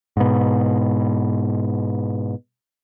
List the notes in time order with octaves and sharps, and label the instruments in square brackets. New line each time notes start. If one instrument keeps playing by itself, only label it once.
[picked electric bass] G#2 B2